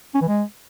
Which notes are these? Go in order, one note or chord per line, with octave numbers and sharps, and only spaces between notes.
C#4
E3
G#3